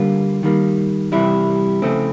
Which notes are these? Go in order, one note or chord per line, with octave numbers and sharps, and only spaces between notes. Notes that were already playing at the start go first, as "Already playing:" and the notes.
Already playing: D3 G3 A#3 F4
D#3 G3 A#3
C3 E3 G3 E4
C#3 F3 A3 C4